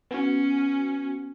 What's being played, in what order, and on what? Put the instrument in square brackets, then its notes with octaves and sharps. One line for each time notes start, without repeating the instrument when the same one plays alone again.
[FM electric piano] B3 F#4 [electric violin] C#4